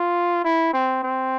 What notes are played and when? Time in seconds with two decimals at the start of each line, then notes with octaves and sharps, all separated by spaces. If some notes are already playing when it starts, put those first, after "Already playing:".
Already playing: F4
0.44 E4
0.73 C4
1.03 C4